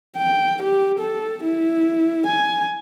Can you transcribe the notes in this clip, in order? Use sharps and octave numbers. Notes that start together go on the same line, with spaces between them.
G5
G4
A4
E4
G#5